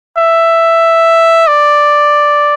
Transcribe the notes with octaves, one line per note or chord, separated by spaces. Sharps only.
E5
D5